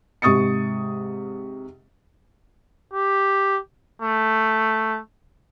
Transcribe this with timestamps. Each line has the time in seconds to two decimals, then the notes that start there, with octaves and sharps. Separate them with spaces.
0.22 G#2 C3 C#6 D#6 A6 C#7
2.93 G4
4.02 A3